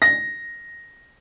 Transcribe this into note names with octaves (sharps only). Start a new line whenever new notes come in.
A#6